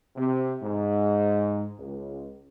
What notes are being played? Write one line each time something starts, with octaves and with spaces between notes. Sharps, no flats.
C3
G#2
C#2